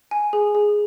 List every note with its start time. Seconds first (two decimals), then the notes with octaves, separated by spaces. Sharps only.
0.11 G#5
0.33 G#4
0.55 G#4